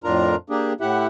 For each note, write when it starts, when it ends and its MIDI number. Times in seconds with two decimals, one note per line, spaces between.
0.04 0.35 41
0.04 0.35 45
0.04 0.35 62
0.04 0.35 65
0.04 0.35 70
0.04 0.35 82
0.50 0.73 58
0.50 0.73 62
0.50 0.73 67
0.50 0.73 68
0.81 1.07 45
0.81 1.07 64
0.81 1.07 67
0.81 1.07 76
0.81 1.07 78